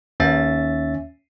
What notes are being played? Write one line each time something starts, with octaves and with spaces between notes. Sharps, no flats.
D#2 C#4 E5 A6